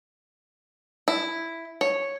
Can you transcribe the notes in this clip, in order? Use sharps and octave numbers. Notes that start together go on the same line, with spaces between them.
E4
C#5